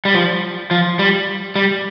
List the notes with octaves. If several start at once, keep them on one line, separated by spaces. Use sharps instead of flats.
G3
F3
F3
G3
G3